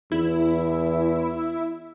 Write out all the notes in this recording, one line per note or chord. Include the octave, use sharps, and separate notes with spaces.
E2 E4